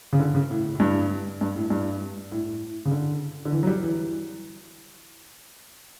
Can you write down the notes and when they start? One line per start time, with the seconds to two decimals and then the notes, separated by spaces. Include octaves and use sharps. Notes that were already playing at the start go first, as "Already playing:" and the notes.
0.13 C#3
0.20 D3
0.35 C#3
0.50 A2
0.75 A2
0.80 G2
1.41 G2
1.56 A2
1.70 G2
2.32 A2
2.46 A2
2.85 C#3
2.91 D3
3.45 D3
3.52 E3
3.63 F#3
3.67 G3
3.83 E3